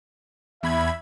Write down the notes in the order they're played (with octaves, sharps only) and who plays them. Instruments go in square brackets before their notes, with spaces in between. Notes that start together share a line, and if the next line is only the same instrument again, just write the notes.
[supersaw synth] E2 B5 G#6 [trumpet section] E5